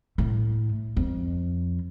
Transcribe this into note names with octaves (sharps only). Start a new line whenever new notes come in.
A2
F2